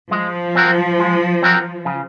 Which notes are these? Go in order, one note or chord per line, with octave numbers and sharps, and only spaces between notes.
F3 G#3
C4 F#4 A#4
G#3
C4 F#4 A#4
C#3